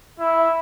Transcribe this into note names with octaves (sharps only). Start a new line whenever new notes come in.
E4